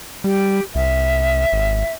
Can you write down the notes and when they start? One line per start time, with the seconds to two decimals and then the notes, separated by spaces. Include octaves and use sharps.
0.24 G3 G4
0.75 C2 E5
1.53 G#1